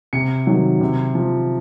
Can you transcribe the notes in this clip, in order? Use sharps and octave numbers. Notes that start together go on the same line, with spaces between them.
C3 C#7
D#3 F#3
C3
F3